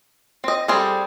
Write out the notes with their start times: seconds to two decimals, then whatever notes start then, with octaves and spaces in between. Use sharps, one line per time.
0.44 C4 D#5
0.68 G3 C4 G#4 A4